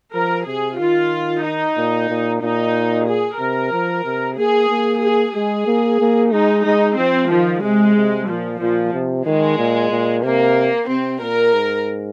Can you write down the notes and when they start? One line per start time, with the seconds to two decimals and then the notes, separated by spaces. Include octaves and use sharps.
0.14 F3 A#4
0.46 C3 G#4
0.79 D#3 F4
1.44 D#4
1.77 A#2
2.09 A#2
2.41 A#2 D#4
3.08 G#4
3.39 C3 A#4
3.72 F3
4.05 C3
4.37 A#3 G#4
4.70 A#3
5.03 G#4
5.35 G#3 G#4
5.67 A#3
6.00 A#3
6.32 G#3 D#4
6.65 G#3 D#4
6.98 F3 C4
7.30 D#3 F3
7.63 C3 G#3
7.95 C3
8.28 A#2 F3
8.60 A#2 F3
8.93 C3
9.26 D#3 G#3
9.58 A#2
9.91 A#2
10.23 C3 A#3
10.88 C3 C4
11.21 A#2 A#4
11.53 G#2